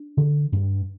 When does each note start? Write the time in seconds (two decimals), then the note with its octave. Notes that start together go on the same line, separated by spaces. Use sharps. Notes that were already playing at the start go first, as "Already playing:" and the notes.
Already playing: D4
0.17 D3
0.52 G2